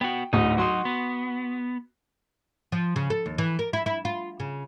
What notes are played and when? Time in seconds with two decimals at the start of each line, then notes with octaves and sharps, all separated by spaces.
0.01 B3 F#4 G5
0.33 D1 D2 D#4
0.58 F#3 D#4 F#4 C6
0.85 B3
2.72 F3
2.96 C#3
3.10 A4
3.26 D#2
3.38 E3
3.59 A#4
3.73 E4
3.86 E4
4.05 F4
4.40 C#3